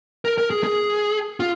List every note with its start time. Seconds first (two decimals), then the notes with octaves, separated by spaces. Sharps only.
0.25 A#4
0.38 A#4
0.51 G#4
0.64 G#4
1.40 F4